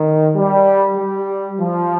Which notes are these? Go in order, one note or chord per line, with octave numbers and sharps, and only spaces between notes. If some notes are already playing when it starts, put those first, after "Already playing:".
Already playing: D#3
G3
G3
F3